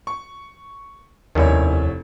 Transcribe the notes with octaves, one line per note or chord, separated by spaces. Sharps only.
C#6
F1 D#2 D#3 G3 C#4 E4 C#5